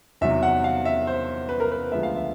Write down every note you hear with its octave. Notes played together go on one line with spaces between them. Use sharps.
E2 C3 D#3 F#3 E5
F#5
F5
E5
C5
B4
A#4
B4
D2 D3 F3 G#3 B3 E5
F5
E5